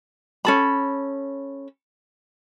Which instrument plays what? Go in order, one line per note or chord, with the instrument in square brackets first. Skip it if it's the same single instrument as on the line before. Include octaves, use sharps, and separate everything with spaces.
[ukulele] C#4 A4 B5